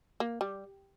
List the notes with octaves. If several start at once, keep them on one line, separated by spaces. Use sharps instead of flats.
A#3
G3